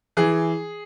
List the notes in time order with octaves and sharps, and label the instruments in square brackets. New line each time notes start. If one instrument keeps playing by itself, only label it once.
[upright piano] E3 G#4